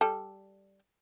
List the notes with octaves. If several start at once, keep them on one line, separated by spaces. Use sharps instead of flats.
G3 A4